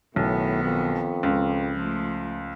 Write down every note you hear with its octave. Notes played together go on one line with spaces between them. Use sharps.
B1 A2 D#3 B3
F2
C#2
F3 A3